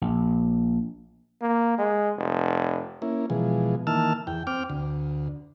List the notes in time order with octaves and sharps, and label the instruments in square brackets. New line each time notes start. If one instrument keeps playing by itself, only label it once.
[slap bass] A#1
[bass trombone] A#3
G#3
F1
[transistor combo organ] A#3 C#4 E4
B2 E3 F3 G#3
D#3 E3 A#3 A5 E6 F6
E2 G5
C4 G5 D6 F6
D2